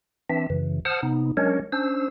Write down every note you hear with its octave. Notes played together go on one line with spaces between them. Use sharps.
E3 C4 D4 E5
F#2 C#3 E3
C5 F#5 A5 D#6 F6
C3 B3 D#4
F#3 G#3 C#4 D4 A#4 C#5
C#4 D4 C5 E6